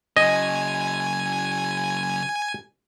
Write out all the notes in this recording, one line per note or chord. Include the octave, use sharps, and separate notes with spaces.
C#3 F#3 D#5 G#5